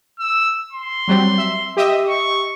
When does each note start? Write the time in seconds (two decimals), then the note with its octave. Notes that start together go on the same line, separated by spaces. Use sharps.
0.20 E6
0.73 C6
1.08 F#3 G3 C4
1.38 E5
1.77 G4 D#5 E5
2.09 C#6